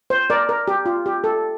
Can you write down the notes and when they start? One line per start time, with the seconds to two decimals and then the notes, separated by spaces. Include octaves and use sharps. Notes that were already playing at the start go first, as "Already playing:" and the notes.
0.10 C5
0.30 A#4 D5
0.49 A#4
0.68 G4
0.86 F4
1.06 G4
1.24 A4